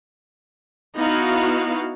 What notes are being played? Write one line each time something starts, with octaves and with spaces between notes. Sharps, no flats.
B3 D#4 E4 F#4 F5